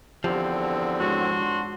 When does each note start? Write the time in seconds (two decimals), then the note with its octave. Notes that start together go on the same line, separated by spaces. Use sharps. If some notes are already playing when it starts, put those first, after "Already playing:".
0.24 E2 D3 F3 C4 G4
1.00 G#2 D4 F#4 C#5 F#5 C6